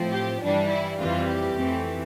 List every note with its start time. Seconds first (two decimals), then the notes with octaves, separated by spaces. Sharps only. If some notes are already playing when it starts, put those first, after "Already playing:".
Already playing: A2 F3 C4
0.12 G4
0.41 G2 E3 G3 D4
0.69 E4
0.99 F2 E3 G3 C4 F4
1.28 G4
1.56 F2 E3 A3 C4